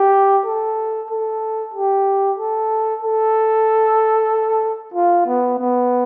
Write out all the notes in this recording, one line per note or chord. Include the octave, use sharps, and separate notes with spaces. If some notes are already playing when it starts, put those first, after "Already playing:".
Already playing: G4
A4
A4
G4
A4
A4
F4
B3
B3